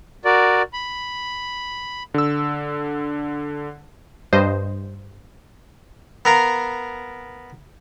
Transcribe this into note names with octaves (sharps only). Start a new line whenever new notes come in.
F#4 A#4 D5
B5
D3 E6
G2 C5 D#5
B3 A#4 F5